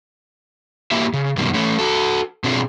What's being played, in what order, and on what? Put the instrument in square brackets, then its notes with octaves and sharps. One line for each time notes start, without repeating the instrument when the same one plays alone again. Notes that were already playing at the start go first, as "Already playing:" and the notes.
[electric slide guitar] A#3 E4 G4 E5
C#3
F#2 B2 D#3 G3
A3 C#4
F#4 A4
B2 C4 D4 F4 G#4